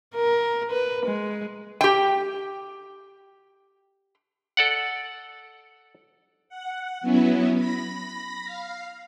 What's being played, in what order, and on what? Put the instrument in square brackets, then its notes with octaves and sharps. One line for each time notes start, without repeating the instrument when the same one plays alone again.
[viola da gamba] A#4
B4
G#3
[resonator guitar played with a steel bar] G4 G5
[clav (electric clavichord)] A4 D5 F#5
[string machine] F#5
F#3 B3 C#4 E4
B5 A#6
F5